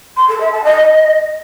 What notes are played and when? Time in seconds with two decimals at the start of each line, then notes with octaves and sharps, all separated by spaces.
0.17 C6
0.28 A4
0.40 E5
0.52 A5
0.64 D#5